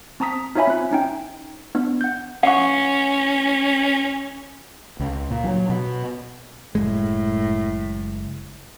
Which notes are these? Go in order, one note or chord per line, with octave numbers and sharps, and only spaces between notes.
C4 A5 A#5 D#6 B6
D#4 F4 C#5 E5 G#5 B5
C4 F#6
C#4 D#4 G5
B3 D4
F#5 G6
C#4 F#5 C#6
C#2
A#2
F#3
B2
F#1 A2 G#3